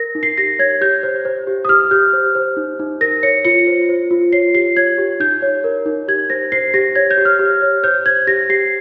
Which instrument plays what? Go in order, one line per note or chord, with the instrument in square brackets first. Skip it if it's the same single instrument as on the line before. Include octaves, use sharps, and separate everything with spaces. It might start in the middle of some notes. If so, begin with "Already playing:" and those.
Already playing: [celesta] A#4 A#6
D#4
C7
G4 A#6
C#5 G#6
G4 G6
C5
C5
G4
D#6
G4 F6
G4 G6
C5
C5
D#4
D#4
A#4 A#6
C#5 C#7
F4 C#7
C5
C5
F4
C#5 C7
G4 C7
C#5 G#6
G4
D#4 G6
C#5
A#4
D#4
G4 G#6
C5 A#6
C5 C7
G4 A#6
C#5 G#6
G6
G4
F6
G4
C#5
C5 G6
C5 G#6
G4 A#6
G4 C7